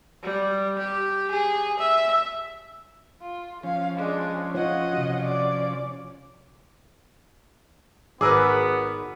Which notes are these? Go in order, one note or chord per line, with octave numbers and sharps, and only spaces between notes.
G3
G4
G#4
E5
F4
F3 C#4 F5
G#3 D4
F4 C#5 D#5 F#5
C3 F#4
D5
G#1 B3 G#4 A#4 B4 D6 E6